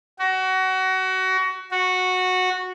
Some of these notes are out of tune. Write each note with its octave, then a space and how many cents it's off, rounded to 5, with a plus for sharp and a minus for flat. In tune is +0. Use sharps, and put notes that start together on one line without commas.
F#4 +25
F#4 -10